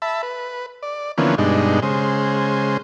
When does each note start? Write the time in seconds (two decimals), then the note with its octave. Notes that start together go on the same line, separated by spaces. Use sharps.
0.02 E5 A5 B5
0.23 B4
0.83 D5
1.18 D3 E3 F3 A#3 B3 C#4
1.38 G2 B2 G#3 D4 D#4
1.82 C#3 G#3 C5